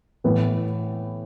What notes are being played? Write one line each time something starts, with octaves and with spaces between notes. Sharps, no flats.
A2 E3 B3